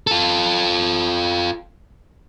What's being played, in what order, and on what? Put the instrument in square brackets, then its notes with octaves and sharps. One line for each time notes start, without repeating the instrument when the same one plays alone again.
[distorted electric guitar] F4 A4